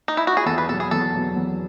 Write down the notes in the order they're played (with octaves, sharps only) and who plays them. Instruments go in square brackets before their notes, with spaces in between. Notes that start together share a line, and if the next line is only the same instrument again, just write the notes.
[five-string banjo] D#4
E4
F#4
G#4
[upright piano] E2 [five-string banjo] A4
[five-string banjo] B4
[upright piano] B2 [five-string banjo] A4
[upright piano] F#3
[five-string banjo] G#4
[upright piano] E2 [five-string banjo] A4
[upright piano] B2 F#3
E2